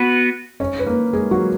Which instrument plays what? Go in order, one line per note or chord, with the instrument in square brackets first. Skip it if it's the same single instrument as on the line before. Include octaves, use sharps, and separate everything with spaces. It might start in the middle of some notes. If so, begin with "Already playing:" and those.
Already playing: [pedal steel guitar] B3 F#4 B4
[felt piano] C#4 C#5
B4
A#3 A#4
G#3 G#4
F#3 F#4